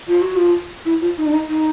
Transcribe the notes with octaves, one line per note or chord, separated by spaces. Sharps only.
F4
F#4
F4
E4
F4
D#4
D4
D#4
D#4